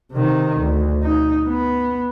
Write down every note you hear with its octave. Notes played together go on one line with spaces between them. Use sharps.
C3 D#3
D2
D#4
B3